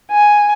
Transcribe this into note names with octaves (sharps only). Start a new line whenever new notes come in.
G#5